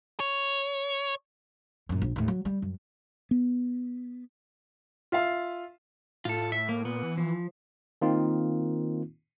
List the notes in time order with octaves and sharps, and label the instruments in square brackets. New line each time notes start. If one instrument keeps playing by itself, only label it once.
[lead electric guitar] C#5
[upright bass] F#2 A#2
A#1
D#2 A2
F#3
G3
F#2
[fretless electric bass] B3
[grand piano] F4 E5 F5
[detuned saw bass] A2 [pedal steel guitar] F4 A4
[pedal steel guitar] E5
A#3
[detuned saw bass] A#2 [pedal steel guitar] B3
[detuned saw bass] E3
[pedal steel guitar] F3
[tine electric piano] D#3 A#3 C4 D#4 F4